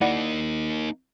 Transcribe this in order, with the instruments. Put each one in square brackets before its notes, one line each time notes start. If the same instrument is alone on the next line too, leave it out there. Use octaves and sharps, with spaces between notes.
[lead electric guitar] A#3 D#4 [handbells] E4 D5 F#5